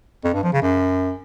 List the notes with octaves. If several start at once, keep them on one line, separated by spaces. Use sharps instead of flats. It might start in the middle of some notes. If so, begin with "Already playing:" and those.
F2
G2
F3
C#3
F#2